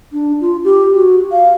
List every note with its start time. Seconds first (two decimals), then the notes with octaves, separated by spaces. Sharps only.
0.13 D4
0.41 F4
0.64 G4
0.94 F#4
1.32 F5